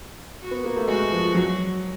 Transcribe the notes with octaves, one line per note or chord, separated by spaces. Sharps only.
F#4
B3
A#3
A3
G#3 F#4
F3
F#3